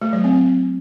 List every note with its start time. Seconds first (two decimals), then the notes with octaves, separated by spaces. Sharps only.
0.02 A3
0.13 F#3
0.24 C4